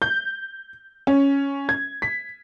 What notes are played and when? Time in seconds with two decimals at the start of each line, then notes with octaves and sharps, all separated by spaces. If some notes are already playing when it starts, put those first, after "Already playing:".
0.02 G6
1.07 C#4
1.69 G#6
2.02 B6